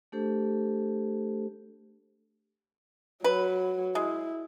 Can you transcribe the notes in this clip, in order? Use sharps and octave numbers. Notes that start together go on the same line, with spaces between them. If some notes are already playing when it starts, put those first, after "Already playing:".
A3 D4 G4 A4 C5
F#3 B4
G#3 E4